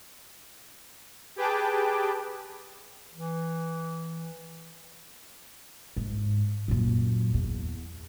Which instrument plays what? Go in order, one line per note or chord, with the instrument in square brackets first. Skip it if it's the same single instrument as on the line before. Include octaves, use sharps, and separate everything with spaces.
[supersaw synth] G4 G#4 B4 G5 A5 D6
[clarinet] E3
[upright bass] G#2
F#2 A#2
E2